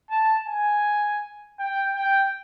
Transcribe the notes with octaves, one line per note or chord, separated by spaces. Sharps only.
A5
G#5
G5
G5